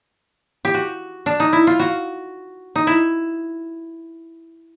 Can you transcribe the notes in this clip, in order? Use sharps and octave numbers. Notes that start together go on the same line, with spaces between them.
G4
F#4
D4
D#4
E4
F4
F#4
D#4
E4